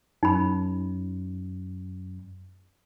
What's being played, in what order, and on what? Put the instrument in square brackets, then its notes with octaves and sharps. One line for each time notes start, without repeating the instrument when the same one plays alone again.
[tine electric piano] F#2 [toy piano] D#4 B5